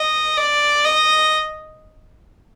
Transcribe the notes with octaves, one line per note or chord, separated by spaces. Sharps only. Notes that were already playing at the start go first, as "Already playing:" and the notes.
Already playing: D#5
D5
D#5